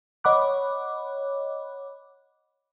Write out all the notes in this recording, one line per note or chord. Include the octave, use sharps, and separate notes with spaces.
C#5 D#5 F#5 B5 D6 F#6